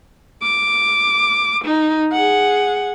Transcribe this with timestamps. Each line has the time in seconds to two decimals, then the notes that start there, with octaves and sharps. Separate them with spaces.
0.42 D6
1.65 D#4
2.13 G#4 F#5